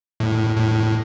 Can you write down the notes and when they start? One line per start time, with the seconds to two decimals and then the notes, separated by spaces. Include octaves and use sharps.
0.20 A2
0.57 A2